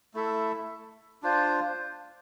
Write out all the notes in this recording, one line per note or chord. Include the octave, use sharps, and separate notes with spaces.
A3 E4 A4 E5
D4 F4 C5